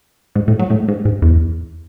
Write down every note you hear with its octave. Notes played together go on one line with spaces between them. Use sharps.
G#2
A2
F#3
A2
G#2
G#2
E2